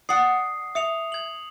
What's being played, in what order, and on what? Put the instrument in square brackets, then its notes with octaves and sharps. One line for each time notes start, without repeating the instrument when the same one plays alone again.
[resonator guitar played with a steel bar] D5 F#5 [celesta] D#6 [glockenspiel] C7
[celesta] E5 [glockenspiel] D#6 C#7 F7
[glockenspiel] G#6 F#7